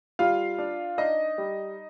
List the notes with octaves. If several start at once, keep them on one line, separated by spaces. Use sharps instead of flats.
G3 F4 F5
D4
D4 D#4 D#5
G3